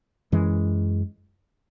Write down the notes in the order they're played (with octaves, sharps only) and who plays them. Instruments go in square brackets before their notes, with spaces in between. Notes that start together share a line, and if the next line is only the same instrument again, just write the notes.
[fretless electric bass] F#2 E3 G#3